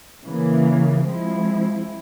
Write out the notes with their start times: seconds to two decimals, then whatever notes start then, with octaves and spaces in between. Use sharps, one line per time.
0.24 C#3 E3 A#3
1.04 F3 G#3 C4 E4